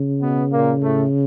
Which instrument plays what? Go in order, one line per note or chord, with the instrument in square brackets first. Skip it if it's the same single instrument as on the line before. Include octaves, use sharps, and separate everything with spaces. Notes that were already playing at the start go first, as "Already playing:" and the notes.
Already playing: [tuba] C#3
[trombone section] B2 B3
A#2 A#3
A2 A3